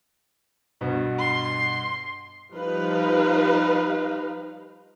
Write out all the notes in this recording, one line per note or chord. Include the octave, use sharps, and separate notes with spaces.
G2 B2 F#4
C6
F3 G3 D#4 B4 F5